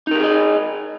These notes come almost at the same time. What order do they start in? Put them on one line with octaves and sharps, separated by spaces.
D#4 A#4 G4 G#4 D#5